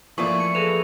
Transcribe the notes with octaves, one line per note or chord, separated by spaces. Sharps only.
E3 F3 A3 A#3 D5 C#6
C#7
G#4 A4 B4 F7